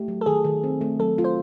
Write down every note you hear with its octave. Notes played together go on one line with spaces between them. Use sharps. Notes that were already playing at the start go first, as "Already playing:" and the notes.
Already playing: A3 G4
F#3
A4
D#3 G#4
D#3
C4
A3
F#3 A4
F4
C5